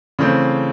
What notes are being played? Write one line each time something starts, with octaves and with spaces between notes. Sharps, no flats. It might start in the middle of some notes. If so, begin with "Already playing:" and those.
C#3 E3 A3 C4